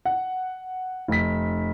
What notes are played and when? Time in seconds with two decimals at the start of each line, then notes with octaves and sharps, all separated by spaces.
0.05 F#5
1.08 F1 B6